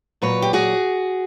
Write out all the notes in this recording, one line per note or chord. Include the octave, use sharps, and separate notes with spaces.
A#2 F#3 B4 C#5
G4
F#4 G#4